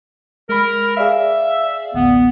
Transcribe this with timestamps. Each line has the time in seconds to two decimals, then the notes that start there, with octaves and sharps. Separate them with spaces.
0.49 G#3 A#4 B5
0.97 G#4 D5 E5 F5
1.94 A1 D2 B3